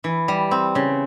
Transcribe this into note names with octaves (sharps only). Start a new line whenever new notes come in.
E3
G3
C4
C#3